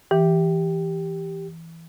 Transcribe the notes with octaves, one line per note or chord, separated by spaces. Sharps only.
E3 G4